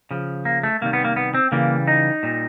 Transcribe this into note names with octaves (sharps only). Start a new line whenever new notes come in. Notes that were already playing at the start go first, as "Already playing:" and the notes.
C#3 F3
A#3
A3
C3 D#3 G3 A#3
B3
A#3
B3
C4
C#3 E3 G3 A#3
D#4
A#2 G3